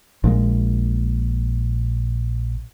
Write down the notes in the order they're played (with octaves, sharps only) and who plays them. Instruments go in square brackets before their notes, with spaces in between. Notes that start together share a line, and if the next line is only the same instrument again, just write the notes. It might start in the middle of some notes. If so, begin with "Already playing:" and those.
[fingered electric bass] A#1 A#2 C#3 G#3